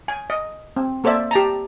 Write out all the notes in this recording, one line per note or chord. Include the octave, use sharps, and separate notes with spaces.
G#5
D#5
C4
A#3 A4 C5 D5 E5
G4 A5 A#5